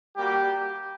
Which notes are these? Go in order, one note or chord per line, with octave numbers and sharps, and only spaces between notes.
G3 A#3 F#4 G4